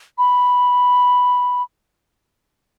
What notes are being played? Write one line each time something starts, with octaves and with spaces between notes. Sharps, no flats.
B5